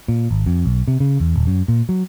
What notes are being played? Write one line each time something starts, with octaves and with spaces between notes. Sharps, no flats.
A#2
G#1
F2
B1
C3
C#3
E2
D#1
F#2
A#2
F#3